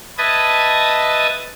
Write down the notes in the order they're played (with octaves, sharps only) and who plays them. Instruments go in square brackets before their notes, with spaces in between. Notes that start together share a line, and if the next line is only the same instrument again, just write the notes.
[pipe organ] B4 D#5 E5 A5 D#6 G#6